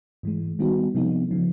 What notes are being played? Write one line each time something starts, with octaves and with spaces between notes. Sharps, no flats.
G#2 E3 G#3
D#3 G3 B3 D#4 F#4
C3 F3 G#3 B3 D#4
C#3 F3